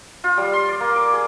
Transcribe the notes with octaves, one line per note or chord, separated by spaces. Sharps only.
F4
G3
C6
D5
A#3
D6
G#4